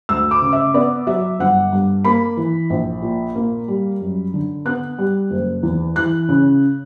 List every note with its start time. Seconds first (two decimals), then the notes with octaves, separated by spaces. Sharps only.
0.09 D2 E6
0.31 D6
0.42 C#3
0.53 E5
0.74 B3 D5
1.07 F#3 E5
1.39 G1 F#5
1.72 G2
2.05 A#3 B5
2.37 E3
2.70 A#1
3.02 A#2
3.35 A#3
3.68 G3
4.01 F#2
4.34 D3
4.65 B3 F#6
4.98 G3
5.31 F#1
5.63 E2
5.96 E3 F#6
6.29 C#3